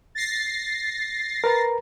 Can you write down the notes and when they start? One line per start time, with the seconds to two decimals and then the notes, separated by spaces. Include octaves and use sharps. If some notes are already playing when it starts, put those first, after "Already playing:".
0.15 A6 A#6 C7
1.44 A#4 B4 A#5